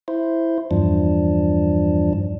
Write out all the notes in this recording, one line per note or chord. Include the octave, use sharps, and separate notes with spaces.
E4 C5
E2 G2 F3 D4